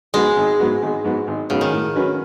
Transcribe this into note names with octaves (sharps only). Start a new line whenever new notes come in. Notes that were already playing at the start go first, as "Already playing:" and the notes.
G#2 F#3 G#3 B3 F#4
G#1
G#2 F#3 B3 F#4
G#1
G#2 F#3 B3 F#4
G#1
G#2 C#3 F#3 B3 F#4
D#3
A2
F#3 C#4 F#4 B4